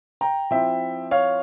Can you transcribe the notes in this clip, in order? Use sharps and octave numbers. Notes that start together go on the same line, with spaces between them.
G5 A#5
F3 C4 E4 E5 G5
C#5 F5